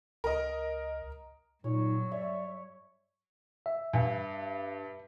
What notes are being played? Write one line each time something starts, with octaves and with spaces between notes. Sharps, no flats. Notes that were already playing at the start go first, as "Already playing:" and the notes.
C#2 A#4 D#5
G2 A#2 F#3 D#4 C#5
C#5 D5 E5
E5
G2